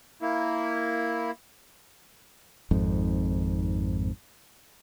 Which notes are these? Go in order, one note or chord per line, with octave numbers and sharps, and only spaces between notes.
A#3 E4
G#1 F2 G#2